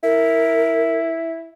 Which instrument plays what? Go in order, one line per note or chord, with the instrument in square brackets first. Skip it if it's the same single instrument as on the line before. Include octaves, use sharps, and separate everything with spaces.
[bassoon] E4 [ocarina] A#4